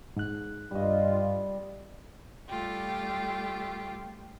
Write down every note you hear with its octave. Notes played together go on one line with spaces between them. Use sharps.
G#2 F#6
G2 G3 F4 D#5
G3 A3 F4 G4